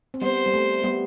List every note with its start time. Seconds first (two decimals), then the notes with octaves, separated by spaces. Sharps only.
0.14 C4
0.22 G3 B3 C5
0.46 G3
0.54 A3
0.84 G3 B3